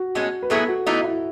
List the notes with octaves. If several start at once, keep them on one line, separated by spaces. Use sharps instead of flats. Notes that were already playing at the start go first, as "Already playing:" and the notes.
Already playing: F#4
A2 G#3 C#4
B4
A2 F#3 B3 E4 G#4 A4
F#4
E3 A3 D#4 E4
E4